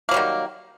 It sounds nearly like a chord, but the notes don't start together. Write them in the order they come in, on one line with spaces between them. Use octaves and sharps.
A#3 F#3 G3 D#3